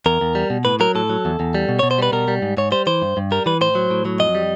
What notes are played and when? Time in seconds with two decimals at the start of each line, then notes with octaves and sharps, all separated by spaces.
0.06 E2 A#4
0.21 E2
0.35 G3
0.50 B2
0.65 A2 B4
0.80 F#3 A#4
0.95 A2 A4
1.10 F#3
1.25 E2
1.40 E2
1.55 G3
1.69 B2
1.79 B2 C#5
1.91 C5
1.98 G3 B4
2.12 B2 A#4
2.28 G3
2.42 G#2
2.57 G#2 C#5
2.72 G3 C5
2.87 E3 C5
3.02 G2
3.17 G2
3.31 G3 A#4
3.46 E3 B4
3.61 A2 C5
3.75 F#3
3.90 A2
4.05 F#3
4.19 F2 D#5
4.35 G3